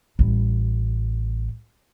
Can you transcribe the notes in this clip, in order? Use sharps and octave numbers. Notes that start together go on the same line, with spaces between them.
A1 G3